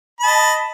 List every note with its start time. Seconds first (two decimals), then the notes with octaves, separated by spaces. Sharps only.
0.20 B5
0.23 A5
0.26 D#5